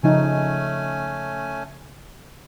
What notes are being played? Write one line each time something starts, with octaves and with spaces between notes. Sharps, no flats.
C#3 F3 A3 C#4 D#4 G#5